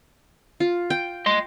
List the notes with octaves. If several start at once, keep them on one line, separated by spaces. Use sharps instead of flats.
F4
G5
D#5 C6